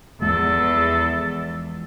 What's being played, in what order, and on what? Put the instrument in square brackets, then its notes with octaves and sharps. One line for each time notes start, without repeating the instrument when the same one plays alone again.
[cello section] E2 [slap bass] E3 F3 G#3 [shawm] A4